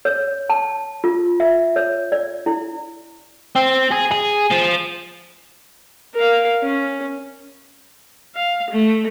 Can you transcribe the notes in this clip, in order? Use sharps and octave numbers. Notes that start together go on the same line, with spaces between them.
C#5
A5
F4
E5
C#5
D5
E4
C4
G#4
G#4
F3
A#4 F5
C#4
F5
A3